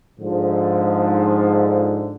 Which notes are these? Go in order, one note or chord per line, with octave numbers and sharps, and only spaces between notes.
G#2 D3 F3